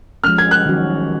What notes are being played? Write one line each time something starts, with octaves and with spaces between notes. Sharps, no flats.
F3 G#3 C#4 F6
G#6
F#6
D#3 F#3 C#4 F#4